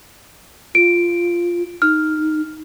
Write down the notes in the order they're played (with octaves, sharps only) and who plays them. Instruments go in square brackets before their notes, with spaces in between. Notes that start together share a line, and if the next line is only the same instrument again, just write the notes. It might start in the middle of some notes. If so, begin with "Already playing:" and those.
[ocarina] F4 [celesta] D7
[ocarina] D#4 [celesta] F6